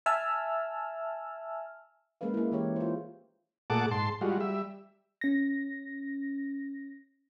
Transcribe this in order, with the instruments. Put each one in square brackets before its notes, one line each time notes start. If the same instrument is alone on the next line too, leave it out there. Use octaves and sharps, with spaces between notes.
[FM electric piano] E5 G#5 A5 E6 F6
[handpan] G#3 A#3 C#4 B4 F5
A#3 E4
E3 G4 C#5
F4 C5
[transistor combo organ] A#2 A3 G#4 F#5 A5 D6
G#2 A5 C6
G3 G#3 F4 F#4
G3 E5
[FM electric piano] C#4 A#6